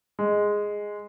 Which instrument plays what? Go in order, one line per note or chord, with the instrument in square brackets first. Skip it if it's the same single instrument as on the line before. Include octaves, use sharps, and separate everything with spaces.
[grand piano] G#3